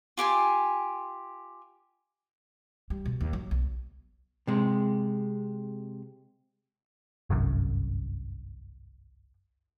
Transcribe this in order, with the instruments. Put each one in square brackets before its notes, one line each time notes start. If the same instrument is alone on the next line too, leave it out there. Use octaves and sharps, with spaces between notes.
[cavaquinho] F4 G4 G#5 C6
[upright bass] G3
B2
D#2
F#3
B1
[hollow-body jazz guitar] C3 G#3
[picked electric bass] G1 C2 F#2